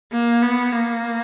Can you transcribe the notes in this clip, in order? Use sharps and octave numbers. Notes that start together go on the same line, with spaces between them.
A#3
B3
A#3